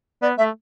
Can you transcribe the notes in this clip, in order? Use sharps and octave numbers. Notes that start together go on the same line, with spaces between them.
B3 D5
A3 E5